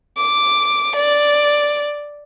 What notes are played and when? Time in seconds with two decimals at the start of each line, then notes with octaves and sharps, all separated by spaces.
0.17 D6
0.96 D5